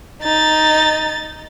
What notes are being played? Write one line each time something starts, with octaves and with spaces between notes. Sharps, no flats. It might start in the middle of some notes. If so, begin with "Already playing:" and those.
D#4 A6